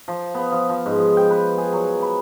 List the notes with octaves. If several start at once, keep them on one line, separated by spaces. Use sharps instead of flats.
F3
B3
F3
F3
G#2
F3
G5
B4
G#4
F#3
B5